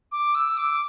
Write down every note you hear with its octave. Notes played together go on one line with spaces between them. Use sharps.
D6
E6
D6